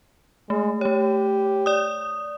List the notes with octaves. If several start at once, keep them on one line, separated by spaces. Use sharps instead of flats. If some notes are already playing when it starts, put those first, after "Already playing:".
G#3 A3
A3 G4 C#5
D5 D#6